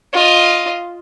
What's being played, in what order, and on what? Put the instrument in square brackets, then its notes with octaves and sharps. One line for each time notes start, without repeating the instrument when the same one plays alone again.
[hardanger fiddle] F4 D#5